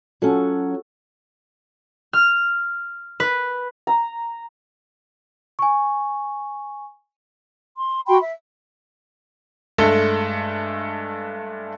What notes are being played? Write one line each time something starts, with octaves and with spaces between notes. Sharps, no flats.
F#3 C#4 F4 F#4 A4
F6
B4
A#5
G#5 C#6
C6
F#4 G5 B5 C6
E5
G2 G#3 A3 A4